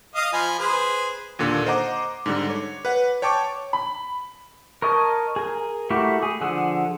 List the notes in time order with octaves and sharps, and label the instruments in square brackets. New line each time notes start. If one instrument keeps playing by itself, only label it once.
[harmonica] D#5 F5 D#6
F3 G#5 B5
G#4 B4 C5
[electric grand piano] D#2 A#2 D3
C5 D#5 F#5 A#5 D6
G#2 D3 G3
C#5
B4 F#5
C#5 G5 A5 C#6 D6
[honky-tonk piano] B5
[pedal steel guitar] A#4 C#5 D#5 A5
G#4 A#4
A3 E4 F#4 G4 A#4
G#4
D3 F3 G#4 F#5 E6